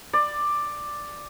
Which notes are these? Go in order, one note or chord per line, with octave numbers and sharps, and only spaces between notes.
D5